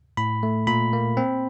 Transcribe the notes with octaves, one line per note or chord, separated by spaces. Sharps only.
A2 B5
A3
A#2 B5
A#3
C4